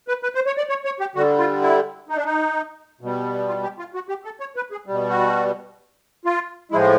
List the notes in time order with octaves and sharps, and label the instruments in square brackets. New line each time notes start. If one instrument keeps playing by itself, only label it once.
[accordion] B4
B4
C5
C#5
D5
C#5
C#5
G4
D3 G3 F#4
F4
E4
D#4
D4
D#4
B2 G3
F4
G4
F4
F#4
G4
A4
C#5
B4
G#4
B2 G3
F#4
F4
A2 F3 G#3 E4